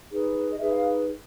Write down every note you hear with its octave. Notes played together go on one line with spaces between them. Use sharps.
D#4 G#4 B4
D#5
D#4 G#4 B4 E5
F5